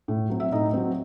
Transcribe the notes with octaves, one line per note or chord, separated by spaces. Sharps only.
A2
F#3 C4
E5
A2 D#4 D#5
F#3 C4